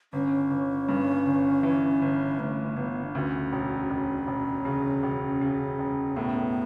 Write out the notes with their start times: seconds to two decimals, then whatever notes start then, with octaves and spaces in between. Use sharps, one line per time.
0.13 G1 C#4
0.51 G1
0.89 G2
1.26 G1
1.63 E3
2.02 G1
2.39 G1 A3
2.76 G1 B3
3.03 D4
3.15 D2 C#4
3.52 E1
3.90 E1
4.27 E1
4.65 C#3
5.03 E1
5.41 C#3
5.79 E1
6.16 A2 B3